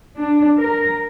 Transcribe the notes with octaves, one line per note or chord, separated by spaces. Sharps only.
D4
A#4